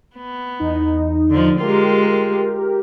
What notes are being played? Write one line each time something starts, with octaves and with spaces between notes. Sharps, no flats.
B3
E2 D#4
D3 F3
G#3 F4 G4 A#4